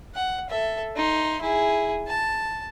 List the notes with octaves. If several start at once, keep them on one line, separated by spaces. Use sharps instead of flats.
F#5
A4 E5
D#4 C6
E4 G#4
A5